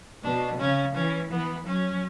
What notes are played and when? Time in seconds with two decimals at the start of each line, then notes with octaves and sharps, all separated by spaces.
0.23 B2 D4
0.59 C#3 C#4
0.95 E3 C#4
1.31 E3 B3
1.67 F#3 C#4